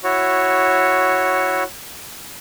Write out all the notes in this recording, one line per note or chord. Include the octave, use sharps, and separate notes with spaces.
E4 F#4 C#5